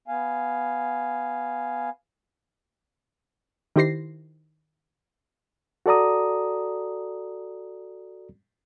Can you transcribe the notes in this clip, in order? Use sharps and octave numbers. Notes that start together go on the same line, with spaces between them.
B3 F5 G#5
D#3 E4 G4 C5 A#6 C7
F#4 A4 D5 A#5 D#6